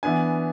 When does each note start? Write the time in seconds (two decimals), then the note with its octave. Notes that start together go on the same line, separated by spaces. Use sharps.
0.03 E3 B3 D4 G#5